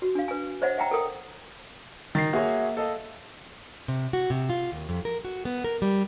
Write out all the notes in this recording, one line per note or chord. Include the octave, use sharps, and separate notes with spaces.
F#4
D4 F5
B4 G#5
C5 C#5 D#5 E5 F#5
E5 F#5 G5 A#5
A4 A#4 G5 D#6
D#3 A6 A#6 C7
A#3 F#4 G#4 C#5 E5
A4 D#5 F5
C3
F#4
C3
F4
D#2
F2
A#4
F#4
B3
A#4
G3